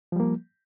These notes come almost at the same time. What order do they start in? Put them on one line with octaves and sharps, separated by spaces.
F3 G3 A#3